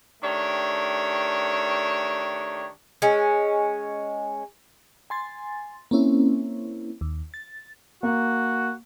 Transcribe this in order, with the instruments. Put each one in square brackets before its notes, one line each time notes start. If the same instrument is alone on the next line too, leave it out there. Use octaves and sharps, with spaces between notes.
[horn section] D#3 A3 D4 G4 C#5
[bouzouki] G#3 C#4
[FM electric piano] G#5 C6 A6
A#3 C4 C#4 E4
D#2
A6
[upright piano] A#3 [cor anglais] F#4